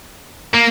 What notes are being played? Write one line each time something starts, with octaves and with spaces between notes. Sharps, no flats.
A#3